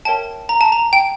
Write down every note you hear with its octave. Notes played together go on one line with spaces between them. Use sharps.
A#4 C#5 E5 G5 A5
A#5
A5
A#5
G5